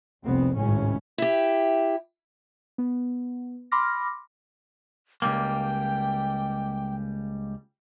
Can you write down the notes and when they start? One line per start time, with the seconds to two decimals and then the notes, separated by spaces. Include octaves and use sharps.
0.24 F1 C2 B3 C4
0.57 G#1 C#2 A2 C#4
1.18 E4 G4
2.78 B3
3.72 B5 C6 D6 F6 A#6
5.22 C#2 G3 A#3 G5